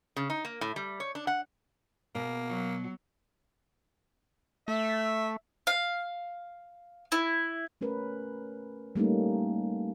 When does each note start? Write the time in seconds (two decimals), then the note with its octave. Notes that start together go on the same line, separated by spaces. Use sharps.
0.16 C#3
0.30 D#4
0.45 A#3
0.61 A2
0.76 G3
1.00 C#5
1.15 D4
1.27 F#5
2.15 B2 A#3
2.48 F#3
4.68 A3 E5
5.67 F5
7.12 E4
7.81 A3 C#4 A#4 B4
8.96 G3 A3 A#3 C#4 D#4